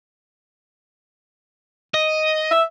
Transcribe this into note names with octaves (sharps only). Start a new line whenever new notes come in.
D#5
E5